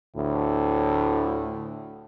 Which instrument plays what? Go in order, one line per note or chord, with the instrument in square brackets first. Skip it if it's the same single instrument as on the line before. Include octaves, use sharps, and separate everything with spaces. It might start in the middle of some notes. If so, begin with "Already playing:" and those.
[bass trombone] D2 [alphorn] A2